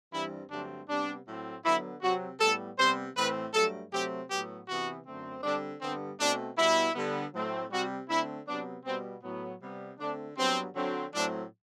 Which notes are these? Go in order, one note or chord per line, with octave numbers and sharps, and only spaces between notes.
G2 E3 G3 C4 E4
G2 D3 F#3 A3 C4 D4
C3 G3 B3 D4
A2 F#3 A3 C4
D3 F#3 B3 E4
C3 F#3 C4 F#4
A2 G3 B3 A4
C3 G3 B3 C5
A2 E3 A3 C4 B4
G2 F#3 A3 A4
C3 F#3 A3 C4 G4
A2 F#3 B3 G4
C3 E3 B3 F#4
F#2 D3 A3 C4
D3 G3 C4 D4
G2 D3 G3 B3 C4
B2 A3 C4 D4
B2 G3 B3 E4
D3 G3 B3
A2 F#3 A3 C4
C3 G3 C4 F#4
D3 A3 C4 E4
C3 F#3 B3 D4
B2 G3 B3 C4
A2 F#3 B3
C3 G3 B3
D3 A3 C4 D4
G2 F#3 B3 C4
D3 F#3 C4
A2 F#3 A3 C4 D4